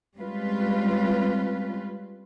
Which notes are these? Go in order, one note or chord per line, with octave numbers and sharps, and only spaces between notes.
G3 G#3 C4 C#4 F4 B4